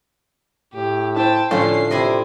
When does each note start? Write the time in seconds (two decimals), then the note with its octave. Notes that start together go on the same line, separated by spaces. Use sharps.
0.74 A2 G4
1.16 E4 C5 G5 A5
1.51 A2 D3 F3 A3 C#4 F4 C7
1.91 C3 E4 D5 D#5